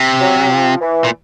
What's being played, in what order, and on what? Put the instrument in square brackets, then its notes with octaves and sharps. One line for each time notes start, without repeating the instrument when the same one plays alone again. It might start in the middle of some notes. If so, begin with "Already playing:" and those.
Already playing: [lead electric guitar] C3
[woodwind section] F#3
F3
E3
[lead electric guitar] A#2